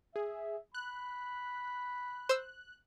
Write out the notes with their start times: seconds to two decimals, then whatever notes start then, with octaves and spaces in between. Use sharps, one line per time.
0.16 G#4 E5
0.74 B5 F#6
2.29 C5 E6